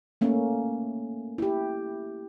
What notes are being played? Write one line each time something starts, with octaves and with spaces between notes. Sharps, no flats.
A3 A#3 C#4
E4 G4